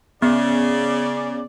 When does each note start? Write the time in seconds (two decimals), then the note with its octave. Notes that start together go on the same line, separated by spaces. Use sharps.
0.22 C#3 B3 D5